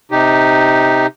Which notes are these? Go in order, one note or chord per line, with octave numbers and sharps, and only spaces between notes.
C3 D#4 G4